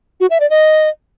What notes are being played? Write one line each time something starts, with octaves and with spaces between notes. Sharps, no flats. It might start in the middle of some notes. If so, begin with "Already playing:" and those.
F#4
E5
D5
D#5